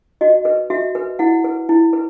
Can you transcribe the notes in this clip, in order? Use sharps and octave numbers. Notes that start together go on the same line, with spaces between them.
F#4 D#5
B4
F#4 E5
B4
E4 F#5
B4
E4
B4